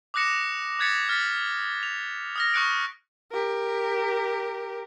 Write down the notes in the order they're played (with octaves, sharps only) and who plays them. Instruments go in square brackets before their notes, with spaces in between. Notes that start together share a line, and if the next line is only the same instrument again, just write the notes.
[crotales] D6 D#6 F#6 A#6 C#7 E7
D#6 F#6 G#6 A6 B6 C#7
F6 A6 B6
F7
D#6 F6 A#6
C#6 D#6 F#6 C#7 D7
[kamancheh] G4 A#4